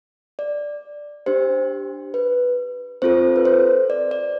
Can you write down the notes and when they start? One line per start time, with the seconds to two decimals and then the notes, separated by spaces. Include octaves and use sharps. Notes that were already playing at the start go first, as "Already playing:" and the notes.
0.39 D5
1.26 D4 G4 C5
2.14 B4
3.02 C4 F4 A4 C5
3.36 B4
3.45 C5
3.90 D5
4.11 D5